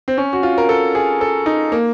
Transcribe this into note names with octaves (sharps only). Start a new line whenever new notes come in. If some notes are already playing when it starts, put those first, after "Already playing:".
C4
C#4
F#4
F4
A#4
A4
G#4
A4
D#4
A#3